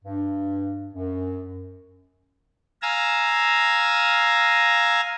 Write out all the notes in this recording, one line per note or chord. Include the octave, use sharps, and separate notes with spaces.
G2
F#2
F5 G#5 A#5 E6